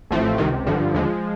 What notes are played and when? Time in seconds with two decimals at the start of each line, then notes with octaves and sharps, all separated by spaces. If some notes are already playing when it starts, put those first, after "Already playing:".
0.10 A1 A2 F3 A3 C4
0.38 C#2 C3 D#3
0.66 A1 G2 D3 F3
0.94 D#2 D3 F3 G#3